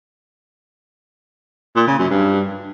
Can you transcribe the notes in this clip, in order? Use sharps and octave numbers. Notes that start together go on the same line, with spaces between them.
A#2
C#3
F#2
G2